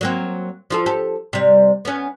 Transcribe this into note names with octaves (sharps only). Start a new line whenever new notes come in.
F#3 A#3 C4
F3 F4 A4
G4 A4
C3 G3
B3 C#4